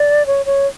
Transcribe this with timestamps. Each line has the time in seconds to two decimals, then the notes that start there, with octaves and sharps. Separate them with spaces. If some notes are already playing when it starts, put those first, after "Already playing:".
Already playing: D5
0.26 C#5
0.46 C#5